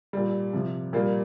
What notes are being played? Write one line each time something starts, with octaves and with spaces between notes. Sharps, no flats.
A#2 G3
C3 F3
A#2 G3 A#3